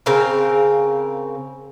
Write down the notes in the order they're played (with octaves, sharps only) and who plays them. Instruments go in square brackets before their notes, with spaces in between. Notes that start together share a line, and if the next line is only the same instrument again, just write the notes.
[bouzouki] C#3 C4 A#4 F5